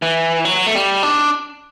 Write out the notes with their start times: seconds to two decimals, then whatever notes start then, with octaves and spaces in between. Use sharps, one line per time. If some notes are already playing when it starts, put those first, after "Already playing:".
0.02 E3
0.45 F#3
0.67 A3
0.75 G3
1.03 D4